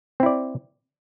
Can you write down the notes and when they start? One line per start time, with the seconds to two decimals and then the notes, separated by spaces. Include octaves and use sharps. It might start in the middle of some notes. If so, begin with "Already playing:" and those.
0.20 C4
0.23 E4
0.26 D5